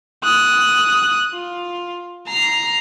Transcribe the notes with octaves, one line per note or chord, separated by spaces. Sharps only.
D#6 F#6
F4
A#5 C7